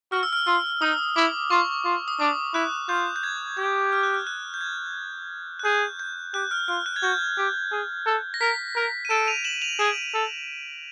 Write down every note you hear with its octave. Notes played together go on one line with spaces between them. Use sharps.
F#4 F6
E6
F6
F4 E6
D#4 D#6
E4 D6
F4 C#6
F4
D#6
D4 D6
E4 F#6
F4 G6
G6
G#6
G4 G6
F6
F#6
F6
F#6
G6
G#6
F#6
G#4 G6
G6
G4 F#6
F6
F4 F6
F#6
G#6
F#4 G6
G4
G#4
A4
A#6
A#4 B6
A#4
D#7
A4 D7 E7
D#7 F7
E7 F#7
D#7 F7
G#4 D7 E7
A4